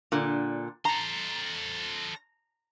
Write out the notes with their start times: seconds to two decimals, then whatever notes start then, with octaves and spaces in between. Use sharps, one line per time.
0.12 A#2 D3
0.85 A4 C5 A#5